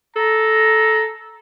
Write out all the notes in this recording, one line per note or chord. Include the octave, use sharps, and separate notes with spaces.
A4 A#5